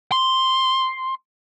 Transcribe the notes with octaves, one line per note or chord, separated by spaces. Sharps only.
C6